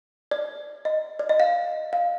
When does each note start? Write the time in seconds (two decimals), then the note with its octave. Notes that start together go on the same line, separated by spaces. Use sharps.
0.31 D5
0.85 D#5
1.19 D5
1.29 D#5
1.40 F5
1.93 F5